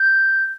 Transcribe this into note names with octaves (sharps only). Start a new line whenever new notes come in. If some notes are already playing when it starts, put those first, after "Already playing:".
Already playing: G6